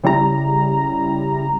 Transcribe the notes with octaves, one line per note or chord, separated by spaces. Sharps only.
C#3 G3 E4 A#5